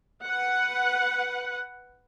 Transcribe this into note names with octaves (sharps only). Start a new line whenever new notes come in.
B4 F#5